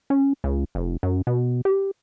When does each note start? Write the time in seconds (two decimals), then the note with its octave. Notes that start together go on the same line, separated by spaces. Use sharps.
0.10 C#4
0.44 C#2
0.75 F1
1.03 F#2
1.27 B2
1.65 G4